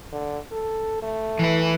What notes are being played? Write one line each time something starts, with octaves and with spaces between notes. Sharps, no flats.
D3
A4
A3
E3 B4